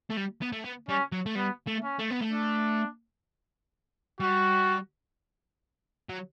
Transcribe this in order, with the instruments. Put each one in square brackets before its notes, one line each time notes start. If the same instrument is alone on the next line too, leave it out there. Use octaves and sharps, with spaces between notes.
[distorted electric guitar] A3
G3
B3
A3
B3
[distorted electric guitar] G3 [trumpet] C#4
[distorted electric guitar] F#3
A3
[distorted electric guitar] G3 [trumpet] B3
[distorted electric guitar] A3
[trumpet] C#4
[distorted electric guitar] A3
B3
A3
[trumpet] D4
[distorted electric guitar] G3 [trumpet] F#4
[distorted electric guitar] F#3